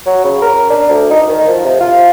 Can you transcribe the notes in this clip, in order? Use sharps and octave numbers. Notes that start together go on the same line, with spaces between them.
F#3
C#3
A#4
D4
D2
D#4
D#3
F3
C3
F4